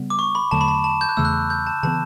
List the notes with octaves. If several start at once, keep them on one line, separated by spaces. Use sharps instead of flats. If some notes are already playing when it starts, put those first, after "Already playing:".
Already playing: C#3 G3 B3
D6
C#6
B5
E2 D3 F#3 A3 A5
B5
A5
A5
G6
F#6
E2 C#3 E3 A3 E6
F#6
G6
A5
C#3 E3 B3 A5